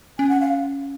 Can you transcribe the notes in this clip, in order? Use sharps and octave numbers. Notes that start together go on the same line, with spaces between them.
C#4 G#5
F#5
F5